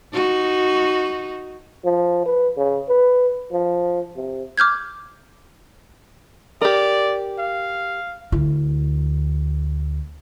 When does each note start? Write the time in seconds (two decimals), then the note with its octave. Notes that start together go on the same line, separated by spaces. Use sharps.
0.13 D#4 F#4
1.85 F3
2.26 B4
2.57 C#3
2.89 B4
3.52 F3
4.16 C3
4.58 D6 F6 G6 G#6
6.62 G4 A#4 D5
7.39 F5
8.32 D2 E4